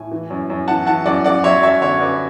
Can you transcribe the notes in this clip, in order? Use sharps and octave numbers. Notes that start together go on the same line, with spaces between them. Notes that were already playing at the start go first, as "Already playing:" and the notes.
Already playing: A2 G#5
E3
F#2
F#2
E3 F#5 A5
E3 F#5 A5
F#2 D5 F#5
F#2 D5 F#5
F#3 C#5 E5
F#2 C#5 E5
D3 C#5 E5
F#2 B4 D5